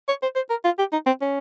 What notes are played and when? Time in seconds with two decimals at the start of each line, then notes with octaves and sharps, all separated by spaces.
0.08 C#5
0.22 C5
0.36 C5
0.50 A#4
0.65 F4
0.79 G4
0.92 D#4
1.06 C4
1.21 C#4